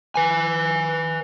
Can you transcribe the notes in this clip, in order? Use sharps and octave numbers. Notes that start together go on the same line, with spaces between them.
B4 G#5